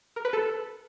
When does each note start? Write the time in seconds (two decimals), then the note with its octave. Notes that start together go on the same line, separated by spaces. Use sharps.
0.16 A#4
0.25 B4
0.33 A4